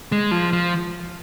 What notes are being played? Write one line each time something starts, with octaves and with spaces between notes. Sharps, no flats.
G#3
F3
F3